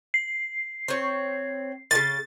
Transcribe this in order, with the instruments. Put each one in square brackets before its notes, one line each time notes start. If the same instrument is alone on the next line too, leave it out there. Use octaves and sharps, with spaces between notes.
[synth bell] C7
[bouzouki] C4 C#5
[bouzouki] A#2 C#3 [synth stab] A6